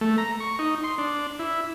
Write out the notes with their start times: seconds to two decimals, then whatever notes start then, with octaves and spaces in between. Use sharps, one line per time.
0.01 A3
0.18 A#5
0.40 C#6
0.59 D#4
0.84 C6
0.98 D4
1.39 E4